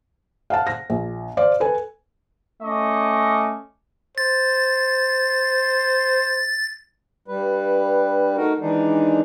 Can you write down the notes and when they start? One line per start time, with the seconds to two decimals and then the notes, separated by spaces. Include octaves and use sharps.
0.50 F5 F#5 A5
0.67 A#6
0.90 A#1
1.37 C5 D5 F5
1.60 A4 B4 G#5
2.63 A3 C#4 D#5 C#6 D6
4.18 C5 A6
7.28 G2 G3 B4
8.36 A3 D#4 F#4 A#4
8.60 D#3 E3 G#3 D4 D#4